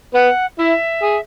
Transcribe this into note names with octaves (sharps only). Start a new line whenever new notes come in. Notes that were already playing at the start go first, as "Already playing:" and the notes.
B3 F#5
E4 E5
G#4